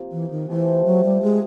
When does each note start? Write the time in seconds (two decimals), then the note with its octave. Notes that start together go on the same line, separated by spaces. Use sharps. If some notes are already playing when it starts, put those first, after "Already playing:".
Already playing: C3 F3 A#3
0.12 E3
0.31 D#3
0.48 C3 E3 F3 A3 C4
0.85 F#3
1.04 G3
1.22 G#3